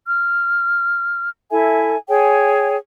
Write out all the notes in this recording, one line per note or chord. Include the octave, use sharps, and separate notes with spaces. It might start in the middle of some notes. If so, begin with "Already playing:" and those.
F6
E4 A4 E5 G#5
G#4 C#5 G5 G#5